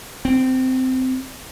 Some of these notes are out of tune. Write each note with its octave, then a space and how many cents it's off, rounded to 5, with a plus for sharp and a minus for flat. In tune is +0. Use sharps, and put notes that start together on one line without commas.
C4 -15